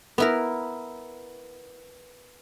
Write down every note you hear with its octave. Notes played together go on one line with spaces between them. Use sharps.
B3 E4 A#4